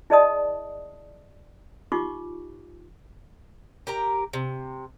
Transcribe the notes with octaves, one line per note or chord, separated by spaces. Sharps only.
E4 G#4 D5 D#5 A5 D#6
D#4 F4 G4 C#6 D6
G4 A#4 A#5
C3